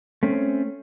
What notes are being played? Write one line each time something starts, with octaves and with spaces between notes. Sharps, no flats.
A3 C4 C#4